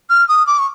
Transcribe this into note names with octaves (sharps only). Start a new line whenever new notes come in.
F6
D#6
D6
C#6